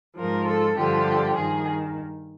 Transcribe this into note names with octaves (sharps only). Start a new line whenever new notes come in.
G#2 F3 A#4
A4
G2 D3 F3 G4
G2 D#3 G#4